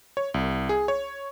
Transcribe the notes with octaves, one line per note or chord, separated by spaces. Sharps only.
C#5
C2
G#4
C#5